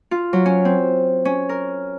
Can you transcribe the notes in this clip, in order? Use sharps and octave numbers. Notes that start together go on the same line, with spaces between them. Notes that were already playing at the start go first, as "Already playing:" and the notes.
F4
F#3
C#4
C4
C#4
A#4